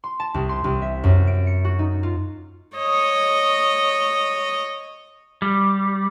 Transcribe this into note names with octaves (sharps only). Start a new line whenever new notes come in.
C6
A5
C2
C6
C2
E5
F#2
D7
C#7
F#4
D#4
F4
C#5 D#5
G3